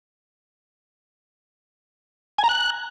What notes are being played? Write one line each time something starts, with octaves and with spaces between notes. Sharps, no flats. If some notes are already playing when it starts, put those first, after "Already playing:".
G#5
A#5
F#6